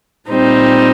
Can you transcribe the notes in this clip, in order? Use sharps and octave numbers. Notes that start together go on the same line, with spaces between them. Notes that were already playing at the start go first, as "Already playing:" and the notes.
A#2 G3 C4 D#4